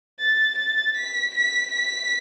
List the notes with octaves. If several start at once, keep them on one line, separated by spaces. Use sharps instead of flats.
A6
A6
B6
B6
B6